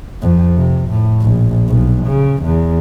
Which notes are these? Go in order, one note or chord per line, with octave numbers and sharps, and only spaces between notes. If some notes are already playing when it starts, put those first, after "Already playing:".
F2
C3
A2
A#1
B1
C#3
E2